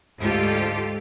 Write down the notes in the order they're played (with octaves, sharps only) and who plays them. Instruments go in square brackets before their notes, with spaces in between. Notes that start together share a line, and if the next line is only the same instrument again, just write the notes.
[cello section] D2 G#2 F4 G4 A4